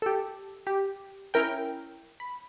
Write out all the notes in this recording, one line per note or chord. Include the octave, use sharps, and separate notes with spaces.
G4 A4
G4
C#4 E4 A#4 G5
B5